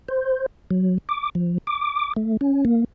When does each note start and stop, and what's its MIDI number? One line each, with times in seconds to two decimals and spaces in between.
0.08 0.46 72
0.71 0.98 54
1.09 1.30 86
1.35 1.58 53
1.67 2.13 86
2.16 2.37 57
2.41 2.65 61
2.65 2.84 58